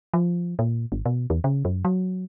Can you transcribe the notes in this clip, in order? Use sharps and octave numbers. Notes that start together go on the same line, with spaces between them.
F3
A#2
G#1
B2
E2
C#3
F#2
F#3